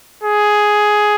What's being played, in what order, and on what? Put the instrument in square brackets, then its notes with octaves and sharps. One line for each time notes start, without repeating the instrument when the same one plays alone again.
[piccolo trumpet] G#4